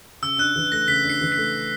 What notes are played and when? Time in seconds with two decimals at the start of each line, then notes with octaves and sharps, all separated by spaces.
0.22 C#3 E6
0.38 D4 F#6
0.56 E3
0.72 A3 A#6
0.88 C#3 B6
1.04 D4
1.10 C7
1.21 E3
1.32 B6
1.37 A3